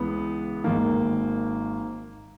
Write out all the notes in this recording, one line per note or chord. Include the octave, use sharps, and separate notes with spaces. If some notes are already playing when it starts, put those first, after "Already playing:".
Already playing: C#2 C#3 E3 B3
G#1 G#2 D#3 A#3